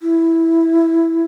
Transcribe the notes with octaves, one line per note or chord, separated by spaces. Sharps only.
E4